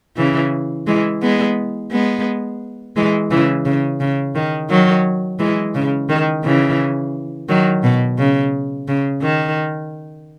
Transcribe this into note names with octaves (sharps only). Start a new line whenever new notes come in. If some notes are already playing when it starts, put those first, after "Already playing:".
C#3 E3
E3 G#3
G#3 B3
G#3 B3
E3 G#3
C#3 E3
C#3
C#3
D#3
D#3 F#3
E3 G#3
C#3
D#3
C#3 E3
D#3 F#3
B2
C#3
C#3
D#3